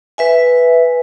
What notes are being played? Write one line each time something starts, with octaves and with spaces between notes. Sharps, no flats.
B4 E5 G#5